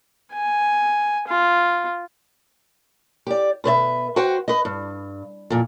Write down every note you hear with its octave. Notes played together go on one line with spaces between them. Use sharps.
G#5
F4
G4 D5
B2 B4 C5 E5
F#4 B4 C5 F#5 G5
B4 D#5
G2
F2 A#2